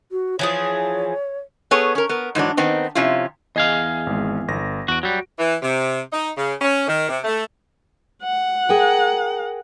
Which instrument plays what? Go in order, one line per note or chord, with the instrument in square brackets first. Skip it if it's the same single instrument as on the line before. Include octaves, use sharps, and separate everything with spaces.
[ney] F#4
[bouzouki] E3 F3 G#4 [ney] C#5
[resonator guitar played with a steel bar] B3 G#4 A4 C#5
C#4 A#4
B3 A#4
G#2 E3 F#3 D4
D#3 B3 C4 D#4
C3 F3 C#4 E4 F4
[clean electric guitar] E2 G#4 F5 [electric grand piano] D#5
[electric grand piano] G#1 G#3
G1 A#6
[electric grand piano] E2 D7 [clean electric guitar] F#4
[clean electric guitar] F#3 G3 [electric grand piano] F#4
[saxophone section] E3
C3
D#4
C#3
C#4
D#3
C3
A3
[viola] F#5
[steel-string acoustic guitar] G#4 A#4 G5